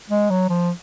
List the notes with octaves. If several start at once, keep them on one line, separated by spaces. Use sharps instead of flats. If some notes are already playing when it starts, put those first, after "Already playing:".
G#3
F#3
F3